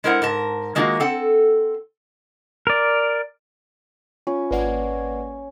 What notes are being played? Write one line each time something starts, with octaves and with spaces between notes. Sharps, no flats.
G#3 E4 A#4 C5 F#5
G#2 A#4 A5
D#3 G#3 A#3 F4 F#4
C4 A4 F#5
A#4 D5
C#4 F4
G#1 A#3 B4 D5 F#5 G#6